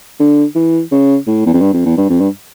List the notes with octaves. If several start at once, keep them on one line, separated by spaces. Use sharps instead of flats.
D3
E3
C#3
A2
E2
F2
G2
F2
E2
G2
F2
G2